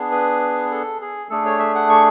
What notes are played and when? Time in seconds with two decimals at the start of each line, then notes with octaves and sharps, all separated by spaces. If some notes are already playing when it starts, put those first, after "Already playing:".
Already playing: B3 D4 G#4
0.12 B4
0.71 A4
1.01 G#4
1.30 A3 D4 G#4 A4
1.46 C#5
1.59 E5
1.75 F#5
1.90 C#6